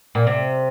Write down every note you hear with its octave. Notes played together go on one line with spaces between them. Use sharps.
A#2
C3